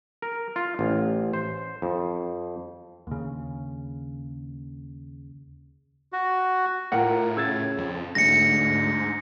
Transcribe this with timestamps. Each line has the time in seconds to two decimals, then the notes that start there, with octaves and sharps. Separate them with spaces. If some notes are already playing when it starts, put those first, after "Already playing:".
0.22 A#4
0.56 F4
0.79 A1
1.33 C5
1.82 F2
3.07 D#2 C#3
6.13 F#4
6.92 A2 F4 A#4 F#5
7.37 C#3 E6 G#6 A6
7.78 F2
8.15 D2 G#2 A#6 C#7